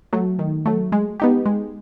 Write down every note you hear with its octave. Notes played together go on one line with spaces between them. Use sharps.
F#3 A3
D#3
F#3 A3
G#3
B3 D#4 G4
G#3